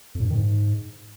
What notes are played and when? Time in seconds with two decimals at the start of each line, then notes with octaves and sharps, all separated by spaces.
0.15 F2
0.20 A2
0.25 G2
0.30 D#3
0.35 G#2